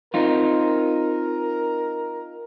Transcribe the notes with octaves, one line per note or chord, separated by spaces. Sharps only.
C4 D#4 F4 A#4